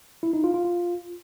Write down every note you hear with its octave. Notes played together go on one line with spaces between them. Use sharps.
E4
D#4
F4
F4
F4